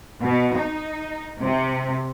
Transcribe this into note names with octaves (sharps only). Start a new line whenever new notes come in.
B2
D#4
C3